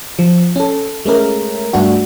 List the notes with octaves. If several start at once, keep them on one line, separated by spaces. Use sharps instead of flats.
F3
C#4 A4
G#3 A3 C#4 A#4
G2 A3 D4 F#4